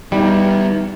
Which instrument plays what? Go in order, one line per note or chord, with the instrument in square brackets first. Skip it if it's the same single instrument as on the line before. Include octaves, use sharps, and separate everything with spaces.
[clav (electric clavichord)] G3 [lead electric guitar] B3 E4 [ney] D#4